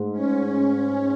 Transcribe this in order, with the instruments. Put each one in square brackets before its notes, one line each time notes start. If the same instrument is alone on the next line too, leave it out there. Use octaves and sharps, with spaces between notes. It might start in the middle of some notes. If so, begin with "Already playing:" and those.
Already playing: [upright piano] G#2 A3
[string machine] C#4